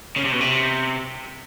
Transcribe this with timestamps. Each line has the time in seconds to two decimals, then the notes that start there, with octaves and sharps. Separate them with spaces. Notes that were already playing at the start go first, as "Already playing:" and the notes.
0.16 C#3
0.25 C3
0.32 B2
0.40 C3